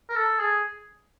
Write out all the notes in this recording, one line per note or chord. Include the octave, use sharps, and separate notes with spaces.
A#4
A4
G#4